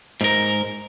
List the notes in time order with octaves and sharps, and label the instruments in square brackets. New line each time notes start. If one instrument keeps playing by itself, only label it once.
[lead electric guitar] G#2 A#4